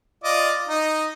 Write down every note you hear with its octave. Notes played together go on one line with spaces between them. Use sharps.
F4 D5 D#5
D#4 D#5